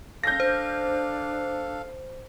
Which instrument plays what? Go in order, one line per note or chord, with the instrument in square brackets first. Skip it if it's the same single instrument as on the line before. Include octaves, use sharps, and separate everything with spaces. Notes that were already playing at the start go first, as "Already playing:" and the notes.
[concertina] A4 F5 [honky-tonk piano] G6 A#6
[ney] D4 [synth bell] C5